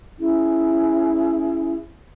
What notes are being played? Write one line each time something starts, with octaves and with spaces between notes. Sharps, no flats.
C#4 E4 G#4